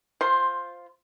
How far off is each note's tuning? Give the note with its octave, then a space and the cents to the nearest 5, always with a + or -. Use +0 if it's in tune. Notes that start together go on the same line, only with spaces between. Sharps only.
F4 +0 C5 +0 C6 +15